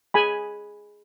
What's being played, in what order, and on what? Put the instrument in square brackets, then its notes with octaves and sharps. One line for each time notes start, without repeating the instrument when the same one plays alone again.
[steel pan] G#4 G#5 B5